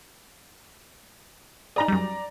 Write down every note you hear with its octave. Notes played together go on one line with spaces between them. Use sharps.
D#4 G#4 D5 A#5 A#6
F#2 G3